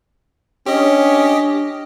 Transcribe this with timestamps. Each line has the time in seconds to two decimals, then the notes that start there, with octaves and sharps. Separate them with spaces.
0.66 C#4 D4 G4 D#5